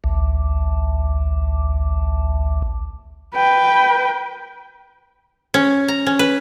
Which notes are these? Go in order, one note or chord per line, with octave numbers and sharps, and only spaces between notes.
A1 D2
B4 G5
C#4
A#5
C#4
B4